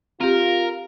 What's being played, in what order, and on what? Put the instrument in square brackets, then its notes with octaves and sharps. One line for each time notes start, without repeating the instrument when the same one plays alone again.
[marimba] C4 G4 [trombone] F4 [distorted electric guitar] A#4